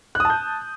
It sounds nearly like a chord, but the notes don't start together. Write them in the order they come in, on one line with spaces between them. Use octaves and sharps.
F#6 D#6 A5 G6